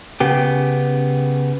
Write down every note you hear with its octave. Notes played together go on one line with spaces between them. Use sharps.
C#3 B3 G4